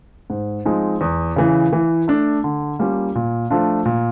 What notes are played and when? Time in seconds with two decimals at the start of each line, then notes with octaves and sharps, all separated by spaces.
0.30 G#2
0.65 F3 G#3 C4 D#4
1.01 E2
1.36 C#3 E3
1.73 E3
2.08 A3 D4
2.44 D3
2.79 G3 A#3 C#4 F4
3.15 A#2
3.50 F3 A3 D4 F4
3.85 A#2